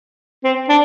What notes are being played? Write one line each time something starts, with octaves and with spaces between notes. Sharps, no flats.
C4
D4